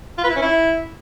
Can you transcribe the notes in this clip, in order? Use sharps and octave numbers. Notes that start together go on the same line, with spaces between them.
F4
B4
E4
C#4
E4